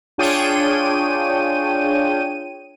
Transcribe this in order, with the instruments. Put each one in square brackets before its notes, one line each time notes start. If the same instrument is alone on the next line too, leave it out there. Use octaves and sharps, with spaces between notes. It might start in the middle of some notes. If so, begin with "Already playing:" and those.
[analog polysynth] D4 F4 G#4 C#5 G5 D#7